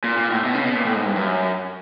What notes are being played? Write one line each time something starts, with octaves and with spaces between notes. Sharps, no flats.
A#2
A#2
A2
B2
C#3
B2
A#2
A2
G#2
G2
F#2